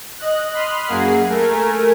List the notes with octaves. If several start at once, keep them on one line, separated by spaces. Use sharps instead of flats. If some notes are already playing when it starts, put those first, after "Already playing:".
D#5 F#6
B5 C6 D#6 F6 F#6
F#2 A#3 G#4 F#5 C7
A3 A#4 G#5